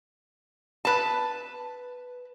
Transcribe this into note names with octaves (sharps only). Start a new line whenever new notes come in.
B4 A5